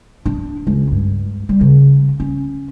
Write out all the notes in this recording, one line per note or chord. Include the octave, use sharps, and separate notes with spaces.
D4
C#2
G2
G3
C#3
C#4